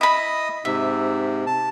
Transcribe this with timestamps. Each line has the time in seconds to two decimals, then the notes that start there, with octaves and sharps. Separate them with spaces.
0.01 E4 D#5 B5 D#6
0.65 G#2 C3 E5
1.46 A5